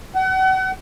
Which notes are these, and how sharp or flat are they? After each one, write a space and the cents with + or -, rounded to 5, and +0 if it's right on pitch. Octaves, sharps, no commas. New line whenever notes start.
F#5 +35